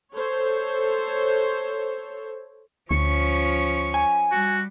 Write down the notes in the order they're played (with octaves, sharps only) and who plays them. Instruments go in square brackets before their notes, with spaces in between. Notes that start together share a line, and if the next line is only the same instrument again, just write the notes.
[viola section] A4 C5 C#5
[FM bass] D2 [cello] F3 C#4 [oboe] C#6
[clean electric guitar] G#5
[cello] G3 [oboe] F#4